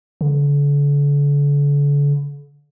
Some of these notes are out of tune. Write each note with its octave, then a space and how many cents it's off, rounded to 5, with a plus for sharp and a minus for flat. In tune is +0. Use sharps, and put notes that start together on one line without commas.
D3 -40